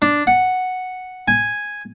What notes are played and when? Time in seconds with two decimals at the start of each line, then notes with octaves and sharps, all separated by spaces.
0.02 D4
0.27 F#5
1.28 G#5